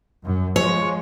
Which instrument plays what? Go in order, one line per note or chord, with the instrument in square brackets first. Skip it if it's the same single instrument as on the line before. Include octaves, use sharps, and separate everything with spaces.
[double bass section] F#2
[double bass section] F3 G#3 [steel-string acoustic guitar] C#5